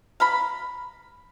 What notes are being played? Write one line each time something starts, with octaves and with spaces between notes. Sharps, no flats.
F5 A#5 B5